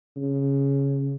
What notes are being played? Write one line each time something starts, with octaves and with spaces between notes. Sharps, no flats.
C#3